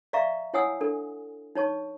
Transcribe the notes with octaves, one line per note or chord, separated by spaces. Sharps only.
D5 E5 F5 A#5 C#6
E4 C#5 F#5 G#5 D#6 E6
D4 A4
D#4 C#5 A5 C#6